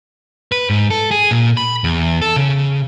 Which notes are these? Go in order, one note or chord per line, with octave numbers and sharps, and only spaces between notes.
B4
G#2
A4
G#4
A#2
B5
E2
A4
C#3